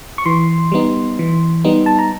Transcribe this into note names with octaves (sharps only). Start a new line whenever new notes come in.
C#6
E3 C6
G3 B3 D#4
E3
G3 B3 D#4
A5
A#5